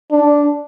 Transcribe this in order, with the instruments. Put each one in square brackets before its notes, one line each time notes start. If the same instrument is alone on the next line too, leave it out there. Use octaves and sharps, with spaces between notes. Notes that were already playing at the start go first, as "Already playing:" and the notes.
[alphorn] D4